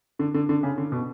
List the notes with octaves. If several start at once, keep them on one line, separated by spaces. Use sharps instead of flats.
D3
D3
D3
C#3
D3
B2